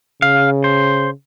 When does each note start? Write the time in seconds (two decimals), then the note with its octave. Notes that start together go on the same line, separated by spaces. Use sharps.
0.22 C#3 F5
0.64 C5